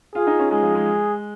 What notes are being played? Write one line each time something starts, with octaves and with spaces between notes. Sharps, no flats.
F4 G#4
D#4
C#4
G#3 G#4
F3
G#3